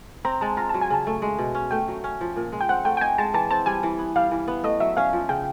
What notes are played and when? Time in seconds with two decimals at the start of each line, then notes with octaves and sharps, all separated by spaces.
0.25 C4 A#5
0.41 G#3 A5
0.57 F4 A#5
0.69 F#3 A5
0.81 G#5
0.90 C#3 A5
1.07 A3
1.22 G#3
1.39 B2
1.55 C#4
1.71 A3 G5
1.88 F#3
2.04 C#4
2.21 F3
2.36 A#2
2.52 G#3
2.61 G5
2.69 C4 F#5
2.85 A3 G5
2.97 G5
3.01 D#4 G#5
3.18 G#3 A5
3.34 E3 A5
3.51 C4 A5
3.66 G3 G#5
3.83 E3
3.99 B3
4.16 G3 F5
4.31 E3
4.48 B3
4.64 A3 D#5
4.80 F#3 E5
4.97 C#4 F5
5.13 F3
5.29 C#3 G5